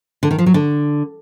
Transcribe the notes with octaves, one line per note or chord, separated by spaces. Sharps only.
D3
D#3
F3
F#3
D3